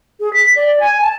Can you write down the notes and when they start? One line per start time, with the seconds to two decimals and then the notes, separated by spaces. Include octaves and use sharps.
0.20 G#4
0.33 B6
0.56 D5
0.80 G#5
1.01 A5